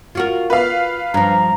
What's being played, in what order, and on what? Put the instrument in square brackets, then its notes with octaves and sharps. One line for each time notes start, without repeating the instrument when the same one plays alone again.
[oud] F4 F#4 A#4
[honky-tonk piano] B4 F5
[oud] G2 F3 [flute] A#5